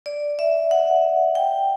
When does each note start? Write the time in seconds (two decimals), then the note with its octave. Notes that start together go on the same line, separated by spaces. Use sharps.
0.06 D5
0.39 E5
0.71 F#5
1.35 G5